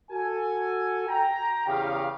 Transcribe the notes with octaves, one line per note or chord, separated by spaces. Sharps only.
F#4 A4 G#5
G5 A#5
E2 C#3 G4 F5